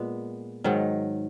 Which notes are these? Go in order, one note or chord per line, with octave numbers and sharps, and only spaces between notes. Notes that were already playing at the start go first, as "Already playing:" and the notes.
Already playing: A#2 G#3 B3
G#2 D#3 F#3